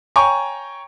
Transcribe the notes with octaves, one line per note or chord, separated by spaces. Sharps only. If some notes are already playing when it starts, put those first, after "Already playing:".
C#5 G5 G#5 A#5 C#6